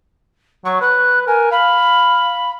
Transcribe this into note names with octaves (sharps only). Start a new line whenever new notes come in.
F#3 C#6
B4 F#6
A#4 G#5
F5 B5